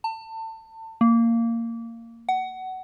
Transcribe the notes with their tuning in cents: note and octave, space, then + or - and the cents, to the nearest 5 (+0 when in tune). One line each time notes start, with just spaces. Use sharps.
A5 +30
A#3 -15
F#5 +20